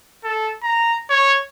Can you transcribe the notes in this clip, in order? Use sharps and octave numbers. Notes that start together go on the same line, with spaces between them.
A4
A#5
C#5